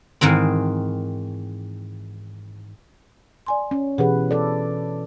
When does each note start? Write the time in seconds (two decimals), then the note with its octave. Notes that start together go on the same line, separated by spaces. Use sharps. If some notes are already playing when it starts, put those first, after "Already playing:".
0.21 G#2 D#3 E3 C4
3.47 D5 G#5 C6
3.71 C#4
3.98 B2 E3 G4 G#4 B4 F#5
4.31 A4 D5